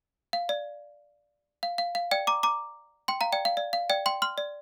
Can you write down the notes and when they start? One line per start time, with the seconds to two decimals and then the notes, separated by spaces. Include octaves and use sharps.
0.33 F5
0.49 D5
1.63 F5
1.78 F5
1.95 F5
2.11 D5 G5
2.27 A#5 D6
2.43 A#5 D6
3.08 G5 C6
3.21 F5 A#5
3.32 D5 G5
3.45 F5
3.57 D5
3.73 F5
3.90 D5 G5
4.06 G5 C6
4.22 C6 F6
4.38 D5